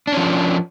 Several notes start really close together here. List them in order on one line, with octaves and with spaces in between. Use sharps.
D4 C#4 F3